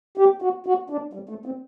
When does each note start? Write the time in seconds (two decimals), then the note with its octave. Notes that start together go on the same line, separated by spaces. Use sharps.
0.17 G4
0.42 F#4
0.66 F#4
0.90 D4
1.13 G3
1.29 A3
1.46 C4